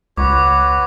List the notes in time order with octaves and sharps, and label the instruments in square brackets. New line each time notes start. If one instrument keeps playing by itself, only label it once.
[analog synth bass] C#2 [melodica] F#4 B4 C#5 [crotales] D6